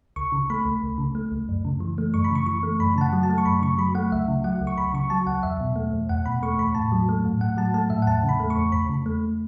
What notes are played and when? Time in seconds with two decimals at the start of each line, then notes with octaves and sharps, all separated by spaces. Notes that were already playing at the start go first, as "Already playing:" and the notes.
0.16 C#2 C#6
0.32 C#3
0.50 A3 B5
0.65 C#2
0.83 C#2
0.98 C#3
1.15 A3
1.32 C#2
1.49 F#2
1.65 C#3
1.80 E3
1.98 A3
2.14 F#2 C#6
2.24 B5
2.30 C#3
2.35 C#6
2.46 E3 C#6
2.63 A3
2.80 F#2 B5
2.96 C#3 A5
3.01 F#5
3.13 F#3
3.23 A5
3.30 A3
3.38 C#6
3.45 F#2 B5
3.62 C#3 C#6
3.78 F#3 B5
3.95 A3 F#5
4.12 C#2 E5
4.28 C#3
4.44 F#3 F#5
4.61 C#2
4.67 C#6
4.77 C#2 B5
4.94 C#3 C#6
5.10 F#3 A5
5.27 C#2 F#5
5.43 E2 E5
5.60 B2
5.76 A3
5.93 E2
6.09 E2 F#5
6.26 B2 B5
6.42 A3 C#6
6.58 E2 B5
6.75 A2 A5
6.92 F#3
7.09 A3
7.25 A2
7.41 A2 F#5
7.57 F#3 A5
7.74 A3 A5
7.90 A2 E5
8.02 F#5
8.07 E2 A5
8.23 C#3
8.29 B5
8.40 A3
8.50 C#6
8.57 E2
8.72 E2 B5
8.89 C#3
9.06 A3